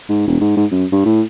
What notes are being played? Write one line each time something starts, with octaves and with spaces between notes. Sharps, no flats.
G#2
E1
G#2
G#2
F#2
G2
A2